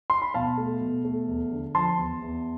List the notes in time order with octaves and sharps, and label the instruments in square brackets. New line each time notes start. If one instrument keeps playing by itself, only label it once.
[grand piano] C6
B5
B2 F5 A5
A3
B2
A3
E2
D3
F3 A5 C6
E2
E2